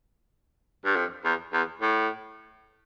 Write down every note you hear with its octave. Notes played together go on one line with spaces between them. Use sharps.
G2
F2
E2
E2
A2